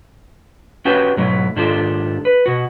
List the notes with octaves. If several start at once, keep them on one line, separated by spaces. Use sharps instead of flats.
C#4 F#4 G4 B4 G5 A5
G#2 B2 F#3 A3 E4
G#2 D#3 D4 F4 G4 A4
B4
B2 F#4